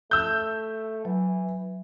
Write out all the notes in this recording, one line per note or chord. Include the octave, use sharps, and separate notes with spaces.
A3 E6 F#6 G6
E3 F#3